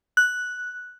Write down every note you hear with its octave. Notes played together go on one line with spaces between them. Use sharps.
F#6